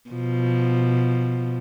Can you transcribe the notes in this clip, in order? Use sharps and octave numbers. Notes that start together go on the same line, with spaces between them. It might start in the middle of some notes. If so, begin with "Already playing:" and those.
B2 F3